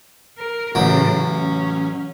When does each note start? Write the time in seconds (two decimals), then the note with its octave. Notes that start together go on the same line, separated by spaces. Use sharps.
0.38 A#4
0.75 A1 A2 C#3 F#3
1.21 C#4